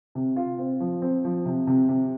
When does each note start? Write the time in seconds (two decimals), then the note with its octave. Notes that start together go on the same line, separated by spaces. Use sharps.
0.15 C3
0.36 F4
0.59 C4
0.80 F3
1.02 C4
1.25 F3
1.46 C3
1.67 C3
1.89 C3